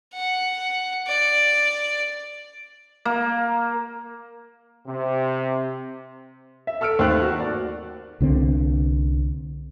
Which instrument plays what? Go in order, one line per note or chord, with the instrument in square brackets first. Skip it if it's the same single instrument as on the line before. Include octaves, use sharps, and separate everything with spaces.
[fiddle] F#5
D5
[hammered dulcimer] A#3
[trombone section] C3
[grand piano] E5
A4 E6 F6 C#7 D7
D#2 A3 C4 A4 F#6
D#3 F#4
D5
[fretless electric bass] C2 D3 G3 C4